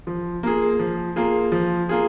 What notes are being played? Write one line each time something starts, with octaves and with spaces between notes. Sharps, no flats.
F3
A#3 F4 G#4
F3
A#3 F4 G#4
F3
A#3 F4 G#4